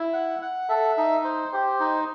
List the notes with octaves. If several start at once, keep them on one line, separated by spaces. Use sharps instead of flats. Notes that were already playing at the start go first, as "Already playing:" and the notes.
Already playing: E4
F#5
F#5
A4 E5
D#4
C5
G4 C5
D#4